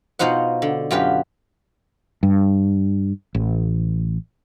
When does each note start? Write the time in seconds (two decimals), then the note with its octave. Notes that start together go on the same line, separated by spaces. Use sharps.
0.19 B2 D#4 F4 C5 F#5
0.62 D3
0.91 F#2 F4 G4 B4
2.23 G2
3.35 A1